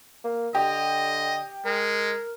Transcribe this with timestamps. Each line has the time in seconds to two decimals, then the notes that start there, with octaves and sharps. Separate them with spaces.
0.24 A#3
0.55 D3 G4 D#5
1.65 G#3 A#4